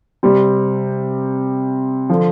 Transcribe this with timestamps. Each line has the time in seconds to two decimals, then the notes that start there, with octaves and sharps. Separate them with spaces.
0.23 C3 G3 C4
2.09 D3 F3